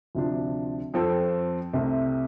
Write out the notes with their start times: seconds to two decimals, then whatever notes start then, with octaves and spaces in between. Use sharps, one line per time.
0.15 D2 C3 F3 D4
0.94 F2 F3 C4 A4
1.74 C2 C3 A3